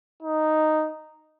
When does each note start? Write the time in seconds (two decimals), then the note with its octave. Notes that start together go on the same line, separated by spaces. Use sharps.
0.22 D#4